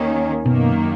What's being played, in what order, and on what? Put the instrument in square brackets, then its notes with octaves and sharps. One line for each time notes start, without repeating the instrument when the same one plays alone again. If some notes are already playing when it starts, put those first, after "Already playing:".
Already playing: [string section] D#2 D#3 A#3 C#4
[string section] F#2 D#3 A#3 [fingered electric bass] B2